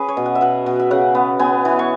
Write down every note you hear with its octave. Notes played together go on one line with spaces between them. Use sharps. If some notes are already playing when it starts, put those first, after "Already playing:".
Already playing: C#4 G#4 B4
C#5
B2
F#5
E5
B2 F#5
B2
E5
C#3 F#5
B3
B3 G#5
E3
C#6